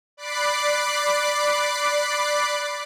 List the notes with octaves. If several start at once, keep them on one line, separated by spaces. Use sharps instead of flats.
D5 B5 D6 F#6 C7